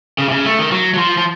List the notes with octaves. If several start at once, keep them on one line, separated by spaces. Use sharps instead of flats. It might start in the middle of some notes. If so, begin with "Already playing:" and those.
C#3
C3
C#3
A3
D#3
F#3
F#3
F3
F3